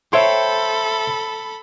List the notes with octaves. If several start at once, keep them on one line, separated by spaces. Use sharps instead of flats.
A4 C5 C#5 E5 G5 B5 C6